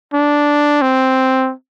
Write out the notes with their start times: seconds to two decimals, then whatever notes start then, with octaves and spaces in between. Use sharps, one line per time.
0.14 D4
0.82 C4